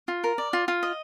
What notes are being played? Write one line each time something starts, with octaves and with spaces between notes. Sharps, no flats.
F4
A#4
D5
F4
F4
D#5